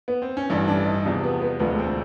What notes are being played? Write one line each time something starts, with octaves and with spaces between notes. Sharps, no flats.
B3
C4
C#4
A1 G2 E3 D4
D4
D#4
E2 C3 F3 D4
B3
B3
E1 D2 D3 F3 B3
C4